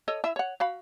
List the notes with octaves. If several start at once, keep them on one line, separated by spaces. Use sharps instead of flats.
A4 C#5 D#5
E4 E5
C#5 F#5
F#4 F5 B5